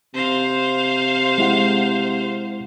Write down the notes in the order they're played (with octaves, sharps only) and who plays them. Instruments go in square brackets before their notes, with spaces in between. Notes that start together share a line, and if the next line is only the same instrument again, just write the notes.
[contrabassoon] C3 [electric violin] C5 F5
[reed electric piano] G#3 E4 F#5